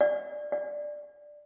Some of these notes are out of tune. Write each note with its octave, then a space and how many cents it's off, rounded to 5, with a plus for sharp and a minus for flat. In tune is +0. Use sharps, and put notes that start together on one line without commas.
D5 +10
D5 +5